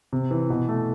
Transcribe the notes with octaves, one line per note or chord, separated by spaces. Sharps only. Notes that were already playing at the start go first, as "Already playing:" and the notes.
C3
E3
B2
A3